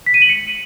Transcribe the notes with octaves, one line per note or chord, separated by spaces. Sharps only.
B6
D#7
F#7
C#7